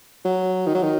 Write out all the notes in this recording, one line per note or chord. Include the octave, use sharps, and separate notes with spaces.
F#3
D#3
F#3
D#3